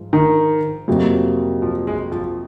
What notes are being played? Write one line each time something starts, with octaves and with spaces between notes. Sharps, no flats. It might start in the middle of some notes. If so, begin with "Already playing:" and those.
Already playing: G#2 F3 G#3
D#3
F2 C3 F#3 A#3
F3
G#3
F3